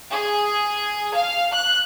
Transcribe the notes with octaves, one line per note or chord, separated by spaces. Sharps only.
G#4
F5
F#6